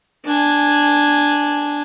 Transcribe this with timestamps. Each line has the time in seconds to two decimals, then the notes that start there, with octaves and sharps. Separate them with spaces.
0.25 D4 G#5